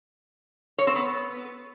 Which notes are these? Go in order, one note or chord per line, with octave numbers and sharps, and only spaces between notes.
C#5
C4
B3